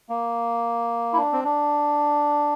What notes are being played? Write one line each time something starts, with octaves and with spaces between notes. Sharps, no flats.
A#3
E4
D4
C4
D4